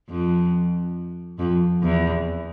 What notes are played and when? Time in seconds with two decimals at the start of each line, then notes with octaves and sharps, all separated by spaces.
0.10 F2
1.39 F2
1.83 E2